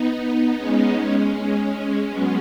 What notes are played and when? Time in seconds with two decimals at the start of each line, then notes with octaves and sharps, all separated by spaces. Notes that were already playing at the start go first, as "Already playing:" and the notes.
Already playing: B3 D#4
0.57 G#3 C#4
2.10 F#3 B3